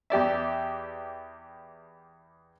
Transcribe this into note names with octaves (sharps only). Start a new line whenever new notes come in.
E2 G4 D5 E5